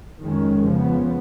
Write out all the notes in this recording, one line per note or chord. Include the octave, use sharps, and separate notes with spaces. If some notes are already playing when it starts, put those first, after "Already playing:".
F2 D#3 G#3 C#4
C#3 F3 B3